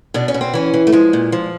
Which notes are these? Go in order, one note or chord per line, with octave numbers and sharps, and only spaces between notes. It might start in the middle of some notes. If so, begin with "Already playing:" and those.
B2 D4
C#4
B2
C4
E3 C#4
E3
A3
F3 G#3
A#2
F3